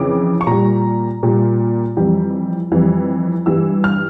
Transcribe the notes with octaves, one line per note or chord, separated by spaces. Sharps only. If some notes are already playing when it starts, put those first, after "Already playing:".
Already playing: F2 C#3 E3 D6
C#6
A#2 G3 A#5
A#2 G3
F2 E3 G3
F2 E3 G3
G2 E3 G3 E6
F6